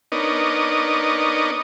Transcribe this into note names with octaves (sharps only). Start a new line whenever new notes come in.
B3 D4 D#4 A#4 C#5 D#5